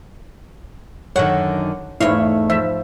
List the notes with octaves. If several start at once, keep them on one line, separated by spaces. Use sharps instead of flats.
F#2 D3 D#3 C#5 F#5
E2 G#2 A3 E4 C#5 F5
F3 E5